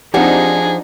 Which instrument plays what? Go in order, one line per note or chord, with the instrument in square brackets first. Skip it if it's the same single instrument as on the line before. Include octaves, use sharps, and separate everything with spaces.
[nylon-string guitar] F3 C5 F#5 [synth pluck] C4 G4 [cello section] D4 D#4 [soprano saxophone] G#4